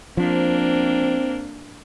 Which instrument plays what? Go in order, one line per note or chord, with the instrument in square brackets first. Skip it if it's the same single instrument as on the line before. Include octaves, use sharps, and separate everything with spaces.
[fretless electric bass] F3 [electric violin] A#3 D4 [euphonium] C4